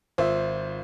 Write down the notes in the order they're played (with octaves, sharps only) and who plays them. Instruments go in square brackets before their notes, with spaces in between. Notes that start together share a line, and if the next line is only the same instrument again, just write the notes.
[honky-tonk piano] G#1 F4 [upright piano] C5 E5